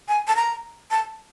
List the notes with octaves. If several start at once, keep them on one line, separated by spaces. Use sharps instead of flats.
G#5
A5
A#5
A5